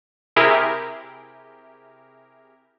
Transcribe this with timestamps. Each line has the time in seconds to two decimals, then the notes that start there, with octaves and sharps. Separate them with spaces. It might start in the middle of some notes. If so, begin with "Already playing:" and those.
0.36 C3 E4 G4 G#4 A#4